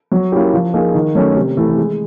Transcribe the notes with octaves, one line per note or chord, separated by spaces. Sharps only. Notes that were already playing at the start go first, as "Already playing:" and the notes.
F#3
A#3 C#4 E4 G4
F3
A#3 D#4 G#4
D#3
F#3 A3 C#4
C3
E3 A3
G#3